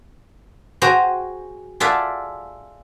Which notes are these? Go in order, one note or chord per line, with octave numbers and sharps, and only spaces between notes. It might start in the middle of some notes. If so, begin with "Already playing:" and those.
F#4 G#4 C5 G5 A#5
F4 G#4 A4 D5 E5 F#5